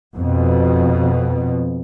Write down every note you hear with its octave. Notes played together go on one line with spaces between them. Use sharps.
F2 B2